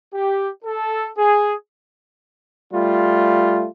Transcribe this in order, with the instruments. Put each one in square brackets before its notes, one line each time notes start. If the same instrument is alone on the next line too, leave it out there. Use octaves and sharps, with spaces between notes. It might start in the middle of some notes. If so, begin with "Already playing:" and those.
[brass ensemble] G4
A4
G#4
[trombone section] G3 A3 F4